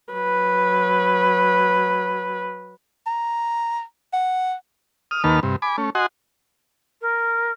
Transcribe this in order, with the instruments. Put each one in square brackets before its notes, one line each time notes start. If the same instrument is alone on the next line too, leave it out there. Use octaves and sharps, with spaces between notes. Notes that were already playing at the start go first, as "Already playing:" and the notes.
[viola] F#3 B4
[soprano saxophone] A#5
F#5
[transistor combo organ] D#6 F6
D#2 D#3 A#3 B4 A5 F6
G2 C3
G#5 B5 D6
A3 C#4
F#4 D#5 F#5 G#5 C6
[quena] A#4